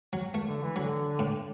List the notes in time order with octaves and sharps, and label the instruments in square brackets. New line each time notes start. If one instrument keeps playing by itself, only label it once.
[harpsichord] F#3
A3
[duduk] D3
E3
[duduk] D3 [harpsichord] F#3
[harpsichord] A2